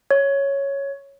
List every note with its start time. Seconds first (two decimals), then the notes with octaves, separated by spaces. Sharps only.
0.11 C#5